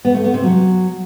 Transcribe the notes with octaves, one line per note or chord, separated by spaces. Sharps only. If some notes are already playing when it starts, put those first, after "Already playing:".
B3
A3
B3
C3
F#3